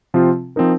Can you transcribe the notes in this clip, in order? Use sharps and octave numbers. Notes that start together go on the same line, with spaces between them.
C3 F3 C4 F4
F3 C4 D#4 A#4